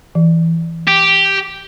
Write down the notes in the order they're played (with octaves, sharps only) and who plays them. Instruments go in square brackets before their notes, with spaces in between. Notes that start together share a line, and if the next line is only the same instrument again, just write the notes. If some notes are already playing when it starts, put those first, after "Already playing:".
[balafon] E3
[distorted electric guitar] G4